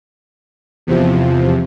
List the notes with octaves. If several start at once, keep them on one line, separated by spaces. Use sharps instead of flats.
E2 C3 F3